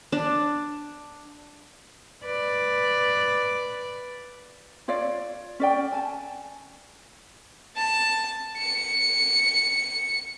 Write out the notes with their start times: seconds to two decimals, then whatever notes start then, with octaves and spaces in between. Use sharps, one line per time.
0.12 D4
2.25 B4 D5
4.88 F4 C#5 D5 F5
5.60 C#4 D5 G5
5.92 G#5 A5
7.76 A5
8.58 C#7